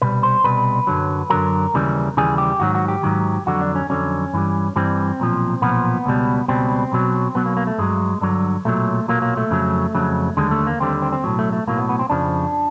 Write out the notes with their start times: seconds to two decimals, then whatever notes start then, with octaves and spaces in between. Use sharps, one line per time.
0.02 C2 B2 G3 B4
0.23 C5
0.44 C2 B2 G3 B4
0.87 F#2 D3 F#3
1.30 F#2 D3 F#3 A#4
1.74 D#2 C#3 E3 G3
2.17 D#2 C#3 E3 G3 G#4
2.38 G4
2.60 G#2 D#3 F#3 F#4
2.75 F#4
2.88 G4
3.03 G#2 D#3 F#3
3.46 F2 D3 F#3 F#4
3.61 D4
3.75 C#4
3.90 F2 D3 F#3 C#4
4.34 G2 E3 G3
4.76 G2 E3 G3 C4
5.20 B1 A#2 F3
5.62 B1 A#2 F3 B3
6.06 C#2 B2 G3
6.48 C#2 B2 G3 C4
6.92 B1 B2 F#3
7.35 B1 B2 F#3 B3
7.46 A#3
7.57 A#3
7.67 A3
7.78 G2 D3 F#3 G#3
8.21 G2 D3 F#3
8.65 B1 A#2 F#3 A3
9.08 B1 A#2 F#3 A#3
9.22 A#3
9.37 A3
9.51 F2 C#3 F#3
9.95 F2 C#3 F#3
10.37 D#2 D3 G3 G#3
10.51 A3
10.67 A#3
10.80 D#2 D3 G3 C4
11.02 C4
11.12 C4
11.24 B1 A2 F#3
11.39 A3
11.53 A3
11.67 B1 A2 F#3 A#3
11.78 B3
11.89 B3
11.99 C4
12.10 F2 C#3 F3 D4